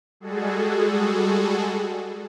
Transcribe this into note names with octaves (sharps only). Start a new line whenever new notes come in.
G3 G#3 F#4 G#4 A4